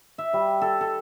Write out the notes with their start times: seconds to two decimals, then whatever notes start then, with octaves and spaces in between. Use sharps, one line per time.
0.18 E5
0.33 G3
0.62 A4
0.81 A4